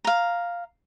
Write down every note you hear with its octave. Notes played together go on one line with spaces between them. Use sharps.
F5 A#5